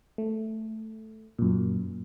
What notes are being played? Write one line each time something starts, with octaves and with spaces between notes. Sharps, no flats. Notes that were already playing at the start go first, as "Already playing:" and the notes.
A3
F#2 A#2